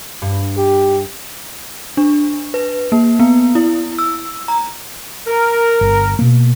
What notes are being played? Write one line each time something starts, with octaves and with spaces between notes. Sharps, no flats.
G2
G4
D4
B4
A#3
B3
E4
E6
A#5
A#4
G1
B2 A#3